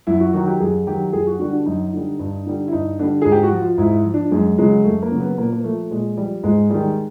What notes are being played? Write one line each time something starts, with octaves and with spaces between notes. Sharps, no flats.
F#2 E4
F#4
D#3 F#3 F#4
G4
F#2 G#4
D#3 F#3 G4
F#2 G#4
F#4
D3 G3 F#4
D4
F#2 D#4
D3 G3
G2
D3 G3
E4
G2 D#4
D3 G3 D4
G#2 G#4
G4
F#4
F3
F4
G#2 E4
F3
D4
F#2 G#3
C#3 F#3 G#3
F#2 A3
A#3
C#3 F#3
B3
A#2 A#3
A#3
F3 A3
A#2 G#3
F3 G3
G#2 G#3
D#3 G3 G#3